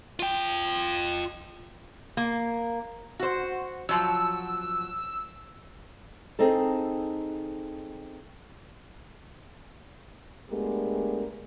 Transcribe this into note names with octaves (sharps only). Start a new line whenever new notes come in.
F4 G5
A#3
F#4 C5
F3 F#3 E6
C4 D#4 G#4 A4
G#3 A3 B3 D4 G4 A#4